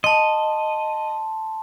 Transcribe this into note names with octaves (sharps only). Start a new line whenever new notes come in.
D#5 A5 C6